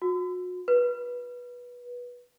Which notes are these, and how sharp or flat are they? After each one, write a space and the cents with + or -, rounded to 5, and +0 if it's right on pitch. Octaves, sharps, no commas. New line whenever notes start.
F#4 -35
B4 -20